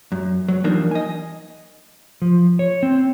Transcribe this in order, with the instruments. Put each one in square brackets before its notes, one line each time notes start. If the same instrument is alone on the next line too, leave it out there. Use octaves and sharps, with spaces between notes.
[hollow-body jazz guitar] F#2
F#3
E3 F3 G3 A#3 D4 D#4
D#5 G#5
[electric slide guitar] F3
C#5
C4